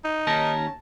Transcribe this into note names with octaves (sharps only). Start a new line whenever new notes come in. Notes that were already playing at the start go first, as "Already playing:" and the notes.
D#4
D#2 C#4 A#4 A5